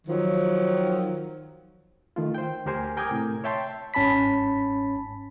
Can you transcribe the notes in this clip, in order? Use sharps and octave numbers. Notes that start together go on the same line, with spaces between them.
D#3 F3 F#3
D#3 A3 F4
C5 G5
D2 G4 A#4 C5 G#5
A#4 G5 G#5 D6 D#6 G#6
A2 C3
C#5 E5 G5 A5 C6
G1 G#2 C#4 A5 B5 B6